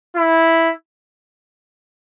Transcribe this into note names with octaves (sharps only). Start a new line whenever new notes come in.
E4